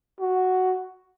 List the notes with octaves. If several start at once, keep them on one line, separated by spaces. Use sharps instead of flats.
F#4